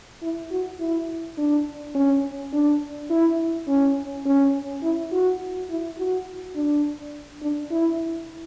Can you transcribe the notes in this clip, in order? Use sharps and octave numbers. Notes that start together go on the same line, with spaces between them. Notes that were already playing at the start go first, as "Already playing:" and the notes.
E4
F#4
E4
D4
C#4
D4
E4
C#4
C#4
E4
F#4
E4
F#4
D4
D4
E4